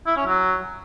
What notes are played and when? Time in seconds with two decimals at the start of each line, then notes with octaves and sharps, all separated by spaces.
0.06 E4
0.16 C#4
0.26 F#3